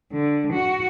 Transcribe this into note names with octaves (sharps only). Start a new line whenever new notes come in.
D3
F#4